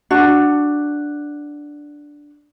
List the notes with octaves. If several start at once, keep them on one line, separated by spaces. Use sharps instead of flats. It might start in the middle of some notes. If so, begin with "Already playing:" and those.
D4 F#4